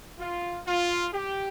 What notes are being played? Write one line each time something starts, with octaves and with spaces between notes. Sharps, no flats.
F4
F4
G4